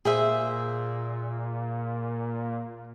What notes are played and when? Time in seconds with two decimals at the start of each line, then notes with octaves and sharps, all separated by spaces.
0.05 A#2 G#4 C5 E5